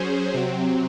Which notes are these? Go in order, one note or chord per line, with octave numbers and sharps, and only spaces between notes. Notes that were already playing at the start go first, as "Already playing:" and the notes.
Already playing: F#3 C#4 G#4 C5
C3 F#3 C4